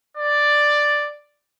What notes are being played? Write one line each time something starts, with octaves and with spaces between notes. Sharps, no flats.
D5